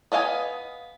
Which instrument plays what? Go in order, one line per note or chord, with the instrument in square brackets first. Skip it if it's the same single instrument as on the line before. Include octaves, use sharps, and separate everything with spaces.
[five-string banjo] B3 D#5 F5 F#5 G#5